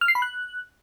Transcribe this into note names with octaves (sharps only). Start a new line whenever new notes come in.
F6
C7
B5
F#6